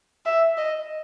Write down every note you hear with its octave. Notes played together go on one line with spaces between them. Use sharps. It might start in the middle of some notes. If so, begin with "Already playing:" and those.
E5
D#5